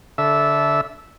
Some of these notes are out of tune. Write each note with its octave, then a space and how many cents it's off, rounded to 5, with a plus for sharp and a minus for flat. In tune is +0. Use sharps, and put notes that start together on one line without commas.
D3 -20 A4 -10 E5 -5